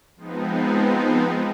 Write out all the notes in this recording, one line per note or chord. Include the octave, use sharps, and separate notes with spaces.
F3 G#3 B3 C4 D#4